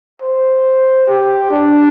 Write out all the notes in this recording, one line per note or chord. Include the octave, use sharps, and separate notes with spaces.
C5
G4
D4